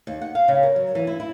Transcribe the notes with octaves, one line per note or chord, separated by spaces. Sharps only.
D#2
F#5
F5
C#3
A#4
F#3
E3
E4
E4